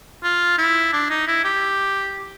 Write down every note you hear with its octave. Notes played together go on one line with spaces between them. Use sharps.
F4
E4
D4
D#4
E4
G4